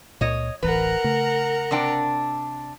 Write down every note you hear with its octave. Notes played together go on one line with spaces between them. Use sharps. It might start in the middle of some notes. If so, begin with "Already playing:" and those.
C#2 A#2 C#5 D#5
D1 A1 E3 A#4 B4 F#5 A#5
C#3 A3
C3 D4 G5